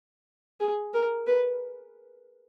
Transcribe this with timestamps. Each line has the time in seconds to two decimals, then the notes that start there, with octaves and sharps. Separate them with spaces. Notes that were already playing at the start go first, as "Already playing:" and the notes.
0.60 G#4
0.94 A#4
1.27 B4